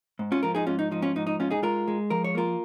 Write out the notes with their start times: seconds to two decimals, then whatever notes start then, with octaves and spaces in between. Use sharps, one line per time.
0.19 G#2
0.32 C#4 F4
0.43 F3 F4 A#4
0.55 D#4 G#4
0.67 G#2 C#4 F4
0.79 D#4
0.91 F3 D#4
1.02 C#4 F4
1.16 G#2 D#4
1.27 D#4
1.39 G#2 C#4 F4
1.51 D#4 G#4
1.62 G#3 F4 A#4
1.88 G#3
2.10 F3 A#4
2.24 C#5
2.35 A#3 F4 A#4